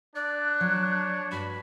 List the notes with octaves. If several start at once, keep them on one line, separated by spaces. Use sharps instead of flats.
D4 D5 F#6
F#3 C#5
G2 F#4 B5